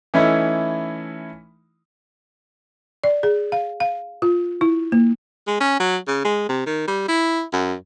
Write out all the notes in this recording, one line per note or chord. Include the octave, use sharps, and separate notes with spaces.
E3 A3 C#4 D#4 E4
D5
G#4
F5
F5
F4
E4
A#3
G#3
C#4
F#3
C#3
G#3
C3
D#3
G3
E4
F#2